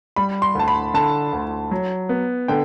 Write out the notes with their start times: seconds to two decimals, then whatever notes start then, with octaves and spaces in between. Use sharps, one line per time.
0.16 G3 B5
0.42 C6
0.55 D2 A5
0.68 B5
0.94 D3 A5
1.33 D2
1.71 F#3
2.09 B3
2.48 D3 G5